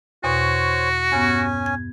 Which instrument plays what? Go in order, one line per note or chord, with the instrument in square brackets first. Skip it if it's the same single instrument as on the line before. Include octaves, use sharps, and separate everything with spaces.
[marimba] E2 B2 [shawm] F#4 [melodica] C5 C#5
[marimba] G2 B3 [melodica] C#4 G#5
[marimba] G#6